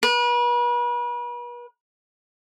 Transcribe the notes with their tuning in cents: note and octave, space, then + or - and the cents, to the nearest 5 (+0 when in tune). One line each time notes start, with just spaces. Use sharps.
B4 -40